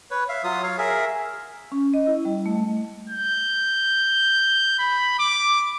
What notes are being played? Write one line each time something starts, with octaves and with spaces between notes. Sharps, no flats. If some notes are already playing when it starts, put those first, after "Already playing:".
B4 C#5
E5 F5
F#3 F4 D#6
C#5 F5
G#4 A#4 E5
C#4
D#5
E4
G3
A3
G6
B5
D6